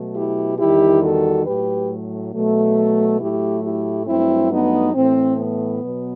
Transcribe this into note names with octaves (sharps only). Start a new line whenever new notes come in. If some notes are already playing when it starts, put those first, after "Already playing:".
Already playing: B2 F#3 A3
E4 G4
E2 D#3 G3 E4 G4
F#4 A4
A2 F#3 A3 G4 B4
B2 F#3 A3
A2 F#3 A3 E4 G4
E4 G4
G2 F#3 A3 C4 E4
B3 D#4
A2 E3 A3 C4
B3
B2 F#3